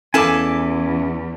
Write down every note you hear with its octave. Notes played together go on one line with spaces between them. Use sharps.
E2 C#4 E4 A4 F5 G#5 D6